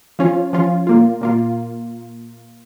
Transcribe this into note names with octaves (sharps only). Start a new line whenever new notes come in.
F3 C#4 F4
F3 C#4 F4
A#2 A#3 F4
A#2 A#3 F4